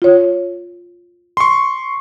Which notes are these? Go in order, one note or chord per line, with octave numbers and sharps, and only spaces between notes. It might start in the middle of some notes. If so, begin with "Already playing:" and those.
F4 C#5
C6 C#6